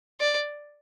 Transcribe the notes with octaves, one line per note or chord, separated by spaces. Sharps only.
D5